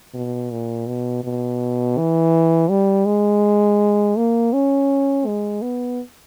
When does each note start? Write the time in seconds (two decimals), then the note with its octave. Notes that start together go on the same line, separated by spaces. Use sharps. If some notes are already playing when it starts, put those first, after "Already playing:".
0.14 B2
0.51 A#2
0.87 B2
1.24 B2
1.98 E3
2.70 G3
3.06 G#3
4.17 A#3
4.53 C#4
5.27 G#3
5.62 B3